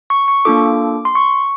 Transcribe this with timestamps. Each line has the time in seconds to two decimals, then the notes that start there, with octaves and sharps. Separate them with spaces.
0.10 C#6
0.28 C#6
0.45 A#3 D4 F4 A4 D6
1.05 C6
1.15 C#6